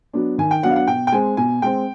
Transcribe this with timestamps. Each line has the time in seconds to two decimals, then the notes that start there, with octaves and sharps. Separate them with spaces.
0.14 F#3 B3 D4
0.38 D#3 G#5
0.51 G5
0.63 F#3 B3 D4 F#5
0.71 F5
0.76 F#5
0.87 B2 G5
1.07 G5
1.12 G#3 C4 G#5
1.37 B2 G#5
1.62 G#3 C4 G5